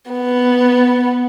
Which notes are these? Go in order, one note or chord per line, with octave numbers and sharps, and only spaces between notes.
B3